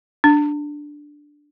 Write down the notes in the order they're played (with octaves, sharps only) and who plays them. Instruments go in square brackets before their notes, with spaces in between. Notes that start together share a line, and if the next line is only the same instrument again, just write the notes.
[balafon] D4